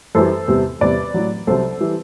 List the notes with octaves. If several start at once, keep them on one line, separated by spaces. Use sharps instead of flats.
F#2 E3 G3 A4 C5
E2 C3 G3
E2 C3 G3 B4 D5
A2 F#3
C2 C3 F#3 A4 C5
E3 G3